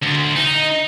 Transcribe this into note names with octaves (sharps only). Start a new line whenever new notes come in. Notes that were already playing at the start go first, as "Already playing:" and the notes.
D2
D#4